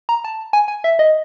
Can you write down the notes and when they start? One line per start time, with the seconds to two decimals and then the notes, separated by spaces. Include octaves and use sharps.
0.09 A#5
0.24 A5
0.53 G#5
0.68 G#5
0.84 E5
0.99 D#5